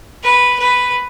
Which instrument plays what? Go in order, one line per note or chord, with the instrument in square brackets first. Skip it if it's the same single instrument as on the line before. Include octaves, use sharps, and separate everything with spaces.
[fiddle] B4
B4